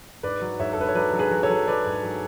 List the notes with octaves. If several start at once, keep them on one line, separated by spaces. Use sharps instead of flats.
G#2 B4 D5
F#3
G#2 C#5 E5
A4
G#2 B4
C#5
F#3 B4 D5
F#3
G#4 B4
F#3
A4 C#5
F#3
F#3 B4 D5
G#2
F#3